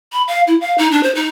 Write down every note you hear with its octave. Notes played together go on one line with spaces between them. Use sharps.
B5
F5
E4
F5
D#4
D4
C5
D#4